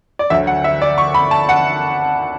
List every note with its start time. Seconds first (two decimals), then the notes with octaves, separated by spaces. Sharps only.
0.19 D5
0.30 D2 D3 F#3 E5
0.47 F#5
0.64 E5
0.82 D5
0.98 C#6
1.14 B5
1.31 A5
1.49 F#5